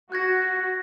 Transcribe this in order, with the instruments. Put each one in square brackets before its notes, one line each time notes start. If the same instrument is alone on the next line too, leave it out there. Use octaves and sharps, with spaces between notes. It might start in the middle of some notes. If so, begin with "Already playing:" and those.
[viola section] F#4 [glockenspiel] F#6 G#6 A#6